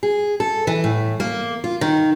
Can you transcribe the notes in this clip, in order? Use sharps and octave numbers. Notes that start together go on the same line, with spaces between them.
G#4
A4
E3
A2
A#3
F4
D#3